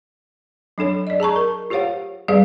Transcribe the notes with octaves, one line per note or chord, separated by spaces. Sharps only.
F#3 D4 A4 C#5
D5 D#5
G#4 A5 A#5 C#6
A#4
F4 G4 C5 C#5 F5 F#5
G3 G#4 B4 D5 F5